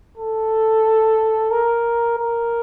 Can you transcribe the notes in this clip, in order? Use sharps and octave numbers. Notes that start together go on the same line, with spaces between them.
A4
A#4
A#4